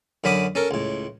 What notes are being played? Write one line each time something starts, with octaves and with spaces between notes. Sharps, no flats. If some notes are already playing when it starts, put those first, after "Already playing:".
F#2 D3 C#4 B5 D6 D#6
C#4 A4 A#4
C#2 A2